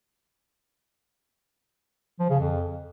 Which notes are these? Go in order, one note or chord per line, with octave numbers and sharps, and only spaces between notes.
F3
C#3
F2